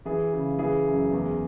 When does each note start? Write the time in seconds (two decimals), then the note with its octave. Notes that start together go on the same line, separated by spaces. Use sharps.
0.05 E3 G#4
0.33 C#3
0.58 E3 G#4
0.86 F#2
1.13 E2